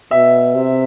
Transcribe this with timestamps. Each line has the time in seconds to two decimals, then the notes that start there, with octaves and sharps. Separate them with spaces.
0.11 B2 E5
0.55 C3